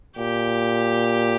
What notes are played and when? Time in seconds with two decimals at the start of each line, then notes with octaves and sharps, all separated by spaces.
0.18 A#2 G4